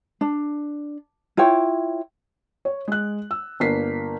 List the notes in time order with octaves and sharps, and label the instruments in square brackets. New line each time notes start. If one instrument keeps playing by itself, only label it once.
[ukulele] D4
E4 F4 C#5 G5
[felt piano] C#5
G#3 F#6
E6
G1 A#3 A#4 B6 C7